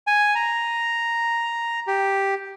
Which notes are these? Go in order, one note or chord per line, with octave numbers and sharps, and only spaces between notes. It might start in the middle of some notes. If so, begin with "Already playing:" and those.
G#5
A#5
G4